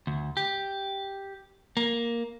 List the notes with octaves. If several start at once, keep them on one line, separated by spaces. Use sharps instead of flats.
D2
G4
A#3